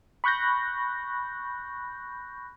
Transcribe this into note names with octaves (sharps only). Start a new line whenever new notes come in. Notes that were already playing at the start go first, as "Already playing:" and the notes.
B5 C#6 F#6 G6 A#6